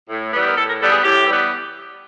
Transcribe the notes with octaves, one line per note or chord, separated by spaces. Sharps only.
A2
E3 G3 B3
A#4
A2 A4
A#4
E3 G3 B3 A4
G#4
A2 G4
E3 G3 B3